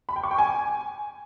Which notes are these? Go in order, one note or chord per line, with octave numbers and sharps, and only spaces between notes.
B5
G5
C#6
G5
G#5